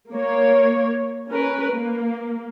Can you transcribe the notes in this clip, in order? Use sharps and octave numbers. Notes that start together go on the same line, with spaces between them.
A#3 C#5
C#4 A#4 B4
A#3